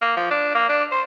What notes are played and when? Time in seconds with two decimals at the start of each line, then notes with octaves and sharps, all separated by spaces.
0.01 A#3
0.16 F3
0.30 D4
0.55 A#3
0.69 D4
0.92 C5